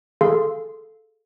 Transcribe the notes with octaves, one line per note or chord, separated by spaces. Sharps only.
G#4 A4 F5 C6